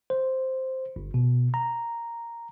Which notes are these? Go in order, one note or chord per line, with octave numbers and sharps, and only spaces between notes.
C5
G1
B2
A#5